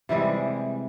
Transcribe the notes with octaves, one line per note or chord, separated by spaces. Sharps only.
C3 E3 G3 G#3